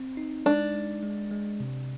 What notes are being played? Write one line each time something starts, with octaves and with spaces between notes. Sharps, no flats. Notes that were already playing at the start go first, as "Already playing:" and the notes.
Already playing: C4
D#4
G#3 D4
G#3
G#3
G#3
C3